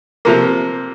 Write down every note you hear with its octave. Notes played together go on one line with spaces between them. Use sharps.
C3 F3 A#3